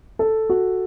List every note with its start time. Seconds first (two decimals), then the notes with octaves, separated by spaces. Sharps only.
0.19 A4
0.49 F#4